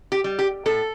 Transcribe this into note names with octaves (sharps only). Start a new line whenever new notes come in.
G4
G3
G4
A2 A4